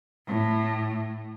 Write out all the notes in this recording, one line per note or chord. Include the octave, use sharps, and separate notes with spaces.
A2